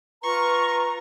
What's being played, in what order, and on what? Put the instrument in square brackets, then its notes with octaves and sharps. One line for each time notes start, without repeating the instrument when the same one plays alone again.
[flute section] F4 A#5 [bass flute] B4 [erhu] C#6